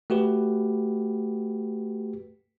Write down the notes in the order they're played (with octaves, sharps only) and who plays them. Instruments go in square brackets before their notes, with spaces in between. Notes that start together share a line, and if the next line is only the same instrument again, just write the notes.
[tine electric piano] A3 F#4 G4 B4